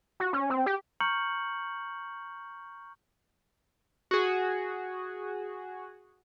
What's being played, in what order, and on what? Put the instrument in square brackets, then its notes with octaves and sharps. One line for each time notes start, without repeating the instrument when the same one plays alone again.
[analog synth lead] F#4
C#4
C4
G4
[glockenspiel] A#5 C#6 F6 G6 C#7 F#7
[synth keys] F#4 G#4